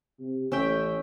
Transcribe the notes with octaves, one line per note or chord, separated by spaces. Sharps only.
C3
A1 C#4 E5 G5